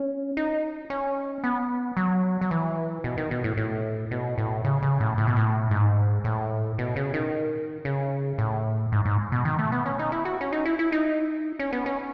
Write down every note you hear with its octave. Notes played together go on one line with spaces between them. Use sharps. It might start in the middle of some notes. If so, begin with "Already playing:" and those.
Already playing: C#4
D#4
C#4
B3
F#3
F#3
E3
B2
D#3
B2
A2
A2
B2
A2
C#3
C#3
A2
A2
B2
A2
G#2
A2
B2
C#3
D#3
C#3
A2
G#2
G#2
B2
D#3
A3
B3
C#4
D#4
E4
F#4
C#4
D#4
E4
E4
D#4
C#4
B3
C#4